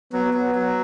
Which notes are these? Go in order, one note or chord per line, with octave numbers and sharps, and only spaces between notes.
F#3 B3
F#3
F#3